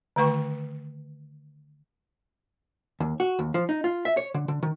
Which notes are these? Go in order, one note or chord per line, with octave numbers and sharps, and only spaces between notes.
D3 D#3 A3 B4 G5 C#6
D#2
F#4
D#2
F3
D#4
F4
E5
C#5
D3
D3
D#3